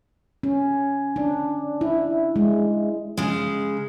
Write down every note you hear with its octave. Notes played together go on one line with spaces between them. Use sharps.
C#4
D4
E4
G#3
C#3 G#3